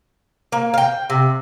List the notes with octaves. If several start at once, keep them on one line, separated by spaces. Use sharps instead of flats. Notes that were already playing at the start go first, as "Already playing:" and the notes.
A#3
F5 G5
C3